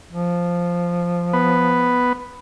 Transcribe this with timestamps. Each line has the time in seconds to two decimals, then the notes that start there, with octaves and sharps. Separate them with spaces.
0.11 F3
1.33 B3